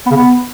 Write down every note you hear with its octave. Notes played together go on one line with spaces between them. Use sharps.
B3
C#3
B3